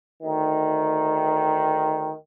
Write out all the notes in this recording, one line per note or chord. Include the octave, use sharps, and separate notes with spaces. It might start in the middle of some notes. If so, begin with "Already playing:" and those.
D2 D#3